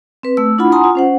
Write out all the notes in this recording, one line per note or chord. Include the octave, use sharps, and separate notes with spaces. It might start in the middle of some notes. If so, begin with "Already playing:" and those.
C4 B4
A3 E6
D4 E4 F4 F#5 B5
F#5 G#5 A#5 C6 D#6
F4
C#4 C5 F#5